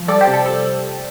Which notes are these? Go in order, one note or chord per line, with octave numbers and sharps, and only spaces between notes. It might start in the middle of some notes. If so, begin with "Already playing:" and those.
Already playing: F3
G3 A4 D5
G4 C5
C3
A4
G3 A4